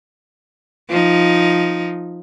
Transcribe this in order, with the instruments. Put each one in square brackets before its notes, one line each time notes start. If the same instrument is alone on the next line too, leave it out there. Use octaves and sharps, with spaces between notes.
[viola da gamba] F3 D#4